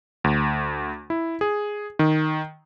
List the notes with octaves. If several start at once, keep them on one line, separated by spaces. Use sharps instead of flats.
D2
E4
G#4
D#3